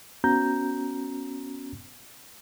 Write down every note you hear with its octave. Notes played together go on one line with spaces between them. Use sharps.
B3 C#4 F#4 A#5 G6